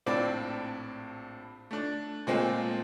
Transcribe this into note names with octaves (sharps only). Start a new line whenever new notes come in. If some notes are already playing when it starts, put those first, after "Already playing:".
A#1 A2 C4 D5
A3 D4
A#2 G#3 A3 C4